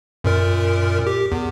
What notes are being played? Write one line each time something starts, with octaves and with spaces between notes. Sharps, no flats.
F#2 A#2 A#4
G4
E2